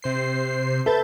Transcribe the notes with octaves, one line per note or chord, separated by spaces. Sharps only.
C3 C5 C7
A4 B4 E5 G6 A6